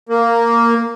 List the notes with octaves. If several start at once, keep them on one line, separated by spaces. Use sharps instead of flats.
A#3